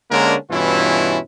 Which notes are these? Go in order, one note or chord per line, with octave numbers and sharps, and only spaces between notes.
D3 G#3 A#3 C#4 D4 A#4
G2 B2 E3 C#4 E4 F4